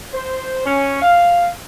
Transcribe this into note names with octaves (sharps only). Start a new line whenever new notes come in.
C5
C#4
F5